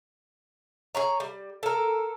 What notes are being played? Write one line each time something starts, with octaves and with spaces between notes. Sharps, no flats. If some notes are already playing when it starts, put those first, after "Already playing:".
G#4 C#5 A#5
G3
A4 A#4